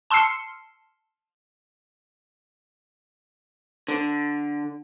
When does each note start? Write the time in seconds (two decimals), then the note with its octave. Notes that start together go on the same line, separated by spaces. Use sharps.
0.11 A5 C6 E6 F6 C7 C#7
3.88 D3